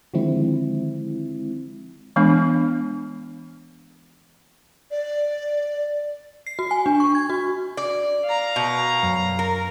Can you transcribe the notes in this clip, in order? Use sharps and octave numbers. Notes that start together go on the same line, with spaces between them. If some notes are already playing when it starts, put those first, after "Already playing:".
D3 D#3 F3 G#3 C4 E4
E3 G#3 B3 D4
D5
C7
F#4
G#5
D4
C#6
G#6
F#4
D5
F5 A#5
B2
F#2
A#4